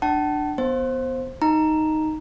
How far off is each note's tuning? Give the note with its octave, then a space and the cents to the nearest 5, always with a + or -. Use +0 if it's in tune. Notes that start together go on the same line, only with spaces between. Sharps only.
D4 +15 F#5 +45 A5 +0
B3 +0 C5 +10
D#4 +0 A#5 +0